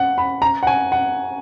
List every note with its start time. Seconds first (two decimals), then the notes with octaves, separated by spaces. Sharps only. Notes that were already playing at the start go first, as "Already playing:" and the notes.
Already playing: F#5
0.18 B5
0.42 A#5
0.63 F#5
0.67 G#5
0.92 F#5